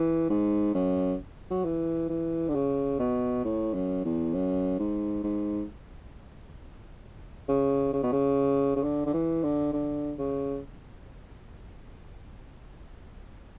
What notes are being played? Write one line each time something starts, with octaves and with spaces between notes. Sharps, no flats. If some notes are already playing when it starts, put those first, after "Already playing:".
Already playing: E3
G#2
F#2
F#3
E3
E3
D3
C#3
B2
A2
F#2
E2
F#2
G#2
G#2
C#3
C#3
B2
C#3
C#3
D3
D3
E3
D3
D3
C#3